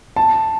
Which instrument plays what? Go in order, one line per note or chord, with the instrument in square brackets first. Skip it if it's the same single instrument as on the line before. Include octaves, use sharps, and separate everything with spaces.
[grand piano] A5